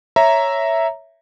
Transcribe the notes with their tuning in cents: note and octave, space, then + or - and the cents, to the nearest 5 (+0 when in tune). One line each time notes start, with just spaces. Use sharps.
C#5 +0 E5 +0 A#5 +0